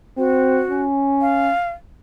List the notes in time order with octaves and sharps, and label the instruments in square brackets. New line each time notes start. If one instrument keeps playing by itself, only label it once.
[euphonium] C4 [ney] F#4
[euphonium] C#4
[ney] F5